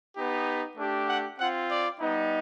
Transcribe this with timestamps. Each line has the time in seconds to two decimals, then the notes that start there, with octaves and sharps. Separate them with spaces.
0.16 B3 D#4 G4
0.77 A3 D4 G4
1.09 F#5
1.39 C4 F4 F#5
1.70 D5
2.01 G3 B3 D#4